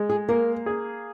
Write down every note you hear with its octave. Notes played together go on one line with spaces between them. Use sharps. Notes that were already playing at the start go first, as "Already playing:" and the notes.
Already playing: G#3
G#4
A#3 A#4
G#4